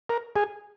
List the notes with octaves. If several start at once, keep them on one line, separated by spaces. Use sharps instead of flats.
A#4
G#4